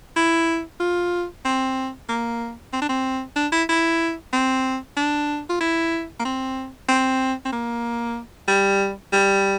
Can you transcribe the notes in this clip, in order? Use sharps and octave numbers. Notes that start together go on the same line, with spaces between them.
E4
F4
C4
A#3
C4
D4
C4
D4
E4
E4
C4
D4
F4
E4
A#3
C4
C4
C4
A#3
G3
G3